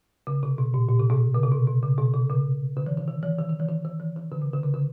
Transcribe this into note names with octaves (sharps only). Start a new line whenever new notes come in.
C#3
C3
B2
A#2
A#2
C3
B2
C#3
C3
B2
B2
C#3
B2
C3
C#3
D3
E3
D#3
D#3
E3
D#3
D#3
E3
D#3
D#3
E3
D#3
D3
C#3
D3
C#3
D3